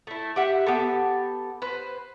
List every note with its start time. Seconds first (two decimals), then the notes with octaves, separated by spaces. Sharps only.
0.07 A3 E4
0.36 G4 E5 F#5
0.66 B3 G4 A4
1.62 B4 C5